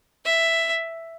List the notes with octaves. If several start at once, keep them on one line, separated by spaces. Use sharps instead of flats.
E5